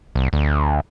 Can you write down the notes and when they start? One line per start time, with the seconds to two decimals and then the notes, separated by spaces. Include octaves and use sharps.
0.15 C2
0.33 D2